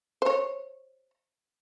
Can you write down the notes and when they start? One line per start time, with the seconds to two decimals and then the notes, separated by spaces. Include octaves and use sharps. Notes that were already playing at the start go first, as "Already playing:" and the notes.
0.22 C5 C#5